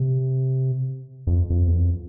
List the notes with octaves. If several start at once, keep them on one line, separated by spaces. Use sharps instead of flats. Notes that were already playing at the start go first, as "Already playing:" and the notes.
Already playing: C3
F2
F2
E2
F2